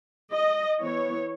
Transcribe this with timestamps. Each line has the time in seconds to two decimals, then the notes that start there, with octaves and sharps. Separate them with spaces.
0.31 D#5
0.80 E3 B3 C#5